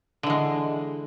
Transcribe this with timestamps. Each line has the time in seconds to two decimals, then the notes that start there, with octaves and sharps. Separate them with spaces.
0.23 D3
0.27 E3
0.30 G#3